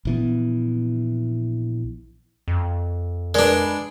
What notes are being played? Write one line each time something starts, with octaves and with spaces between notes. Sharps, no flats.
A#1 E3 B3
F2
G#3 D4 A#4 B4 D5